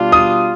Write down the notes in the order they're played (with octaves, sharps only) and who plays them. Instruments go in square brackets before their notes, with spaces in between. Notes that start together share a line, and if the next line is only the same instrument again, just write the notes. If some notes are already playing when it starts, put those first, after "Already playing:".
Already playing: [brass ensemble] B2 G3 D4 F4
[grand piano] D#6